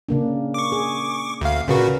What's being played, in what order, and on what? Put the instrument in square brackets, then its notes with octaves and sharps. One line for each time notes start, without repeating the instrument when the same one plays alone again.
[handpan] C#3 A#3 D4
[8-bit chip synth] C#6 D6
[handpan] G#4
[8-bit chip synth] D2 F5
[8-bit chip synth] A#2 C#3 F#4 [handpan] C#4 A#4 B4